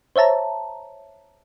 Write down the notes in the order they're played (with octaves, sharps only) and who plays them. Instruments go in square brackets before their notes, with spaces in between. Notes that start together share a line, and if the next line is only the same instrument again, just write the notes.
[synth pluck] C5 C#5 E5 A5 A#5